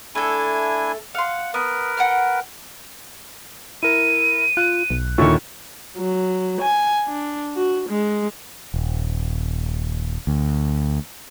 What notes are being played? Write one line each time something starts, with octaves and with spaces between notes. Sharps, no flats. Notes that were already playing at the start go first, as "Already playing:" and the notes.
A3 D4 E4 A4 G#5
F5 F#5 C6
B3 A#4 B4
F#5 G5 F6
E4 A#4 D#7
F4 F#6
B1
D#2 A#2 D3 D#3 E4 A4 C#5 C#6
F#3
G#5
D4
F#4
G#3
D#1
D2